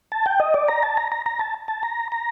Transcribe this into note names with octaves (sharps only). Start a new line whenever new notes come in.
A5
G5
D#5
D5
A#5
A5
A#5
A#5
A#5
A5
A5
A#5
A#5